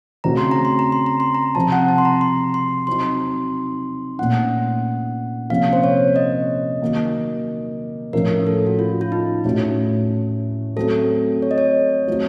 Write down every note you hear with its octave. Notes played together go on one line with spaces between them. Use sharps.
C#3 A3 C4 F#4 A#5
C6
A#5
C6
A#5
C6
A#5
C6
A#5
C3 F3 C4 A5
F#5
A5
C6
A#5
C6
C6
F#3 C4 D#4 C6
A#2 A3 C#4 F#5
C3 F3 A#3 C#4 F5
C5
C#5
D#5
D#3 F#3 A#3
A2 F3 A3 C#4 A#4
A4
F#4
F4
F4
D#4
A2 A3 C#4 F#4
F#3 A3 C4 A4
C#5
D#5
C#5
F#3 A3 C4 F4